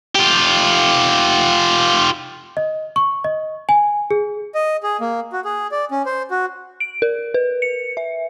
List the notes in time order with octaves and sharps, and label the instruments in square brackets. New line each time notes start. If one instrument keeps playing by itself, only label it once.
[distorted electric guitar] F4 G4
[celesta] D#5
C#6
D#5
G#5
G#4
[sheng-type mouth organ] D#5
G#4
A#3
F#4
G#4
D5
C#4
C5
F#4
[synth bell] D7
A#4
B4
C#7
E5